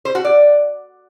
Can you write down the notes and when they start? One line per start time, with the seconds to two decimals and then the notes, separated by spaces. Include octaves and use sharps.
0.05 C5
0.15 F#4
0.25 D5